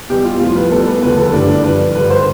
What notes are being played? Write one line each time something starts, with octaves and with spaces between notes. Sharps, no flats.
E2 B2 G3 G4
F4
A2 F3 F4
B4
E2 B2 G3 A4
B4
D2 D3 F3 B4
A4
G2 D3 G3 D4
D4
G2 F3 B4
G2 D3 G3 B4
C5